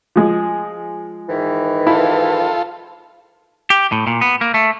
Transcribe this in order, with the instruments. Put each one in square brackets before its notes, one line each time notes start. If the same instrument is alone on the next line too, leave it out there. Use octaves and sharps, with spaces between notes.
[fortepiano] F3 G#3 G#4
[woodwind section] G#2 D#3 E3
[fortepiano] E4 [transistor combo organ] F4 A4
[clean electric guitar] G4
A2
A#2
B3
A#3
A3